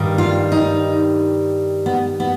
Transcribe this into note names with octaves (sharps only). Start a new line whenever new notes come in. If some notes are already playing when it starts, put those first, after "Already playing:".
Already playing: G2 D#3 G3
F4
D#4
B3
B3